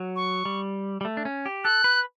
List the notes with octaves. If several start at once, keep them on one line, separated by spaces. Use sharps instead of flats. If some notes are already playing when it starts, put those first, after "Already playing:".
Already playing: F#3
C#6
G3
G3
A3
D4
C#4
G4
A4 F#6
B4